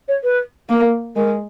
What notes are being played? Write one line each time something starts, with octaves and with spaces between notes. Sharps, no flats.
C#5
B4
A#3 A#4
G#3 A#4